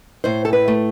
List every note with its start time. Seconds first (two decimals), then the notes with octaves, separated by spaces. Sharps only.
0.24 A2 C5
0.45 A4
0.53 B4
0.68 A3